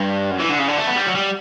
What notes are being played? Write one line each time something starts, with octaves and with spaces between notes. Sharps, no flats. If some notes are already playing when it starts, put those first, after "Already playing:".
Already playing: G2
F#2
E3
D3
C#3
D3
A3
B3
G3
F#3
G3